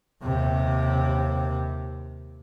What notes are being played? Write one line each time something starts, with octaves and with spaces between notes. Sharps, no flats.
D#2 C3